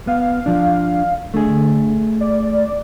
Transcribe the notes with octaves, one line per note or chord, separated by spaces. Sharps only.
B3 F5
F3 D4
D3 A3 G#4
D5